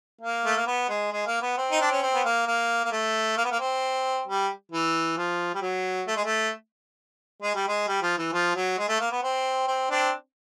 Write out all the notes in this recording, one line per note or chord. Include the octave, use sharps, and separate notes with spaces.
A#3
A3
A#3
B3
G#3
G#3
A#3
B3
C4
D#4
D4
C#4
C4
B3
A#3
A#3
A#3
A3
A#3
B3
A#3
C4
G3
E3
F3
G3
F#3
A3
G#3
A3
G#3
G3
G#3
G3
F3
E3
F3
F#3
G#3
A3
A#3
B3
C4
C4
C4 D4